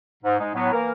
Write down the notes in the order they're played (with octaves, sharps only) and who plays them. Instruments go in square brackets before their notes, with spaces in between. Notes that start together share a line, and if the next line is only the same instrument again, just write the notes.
[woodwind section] G#2
G#3 D#4
A2 F#3 B3
E3 A#3 A#4